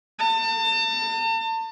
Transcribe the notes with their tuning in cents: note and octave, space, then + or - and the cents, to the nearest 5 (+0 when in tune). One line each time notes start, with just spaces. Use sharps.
A5 +40